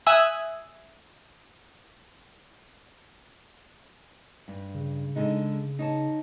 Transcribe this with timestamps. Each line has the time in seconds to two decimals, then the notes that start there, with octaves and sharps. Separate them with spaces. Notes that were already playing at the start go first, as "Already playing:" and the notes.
0.07 E5 G#5 D#6 E6 F#6
4.48 G2
4.75 C#3
5.16 D3 G#3 D#4
5.79 D#4 C#5 A5